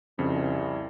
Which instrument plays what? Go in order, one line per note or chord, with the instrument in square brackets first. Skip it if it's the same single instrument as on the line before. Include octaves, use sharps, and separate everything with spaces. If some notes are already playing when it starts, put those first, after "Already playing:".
[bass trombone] C2 [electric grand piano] F2 C#3